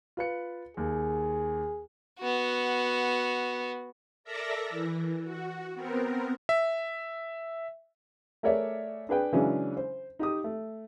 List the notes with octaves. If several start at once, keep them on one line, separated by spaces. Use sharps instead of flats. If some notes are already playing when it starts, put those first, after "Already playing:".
F4 B4 C#7
D#2 G#4
B3 F#4
A4 A#4 D5 E5 A#5
E3
F#4
B3 C4 A#4
E5
A3 G#4 A#4 C#5 D5 E5
D4 G#4 B4 G5
C#3 E3 F#3 G#3 C#4 D4
C5
D#4 G4 D#6
A3